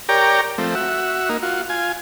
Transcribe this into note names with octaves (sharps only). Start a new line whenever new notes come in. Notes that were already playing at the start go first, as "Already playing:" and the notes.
G4 A#4 C#5 D5 G5 A#5
F3 A3 C4
F#4 E5
A#3 D#4
F4 F#4
F4 G#5